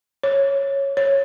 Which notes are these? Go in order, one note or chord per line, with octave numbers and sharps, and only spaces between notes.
C#5
C#5